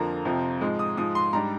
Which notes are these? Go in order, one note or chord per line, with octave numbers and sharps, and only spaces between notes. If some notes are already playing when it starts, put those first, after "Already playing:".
Already playing: F2 D3 F3 A#3 A#5
F2 C3 F3 C4
G#2 F3 G#3
D#6
G#2 F3 G#3 D#6
C6
G#2 G3 D4 A#5